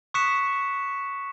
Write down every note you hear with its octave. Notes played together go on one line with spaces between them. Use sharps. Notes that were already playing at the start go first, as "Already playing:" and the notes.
C#6 D#6 F#6 B6 C#7 E7